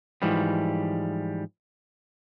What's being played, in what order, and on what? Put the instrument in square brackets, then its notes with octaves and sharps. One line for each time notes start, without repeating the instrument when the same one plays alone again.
[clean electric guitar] G#2 E3 F3 G3